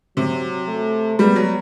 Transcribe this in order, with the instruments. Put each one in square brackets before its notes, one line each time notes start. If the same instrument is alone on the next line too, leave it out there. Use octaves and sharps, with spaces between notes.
[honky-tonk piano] C3 [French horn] F#3
[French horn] A3
[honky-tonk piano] G3 [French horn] B3
[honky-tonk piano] F#3